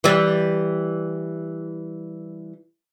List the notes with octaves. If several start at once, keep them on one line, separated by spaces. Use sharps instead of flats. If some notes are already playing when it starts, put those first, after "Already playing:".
E3 G3